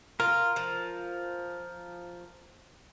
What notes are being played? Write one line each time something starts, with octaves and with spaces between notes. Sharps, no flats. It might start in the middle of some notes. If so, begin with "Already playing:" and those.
F4 A#4
F3